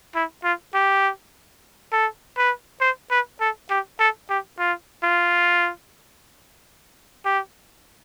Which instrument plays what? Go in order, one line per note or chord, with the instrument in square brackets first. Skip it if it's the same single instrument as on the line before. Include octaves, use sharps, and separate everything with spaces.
[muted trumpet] E4
F4
G4
A4
B4
C5
B4
A4
G4
A4
G4
F4
F4
G4